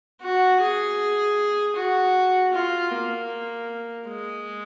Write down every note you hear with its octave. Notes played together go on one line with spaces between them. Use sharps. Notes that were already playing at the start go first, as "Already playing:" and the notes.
F#4
G#4
F#4
F4
A#3
G#3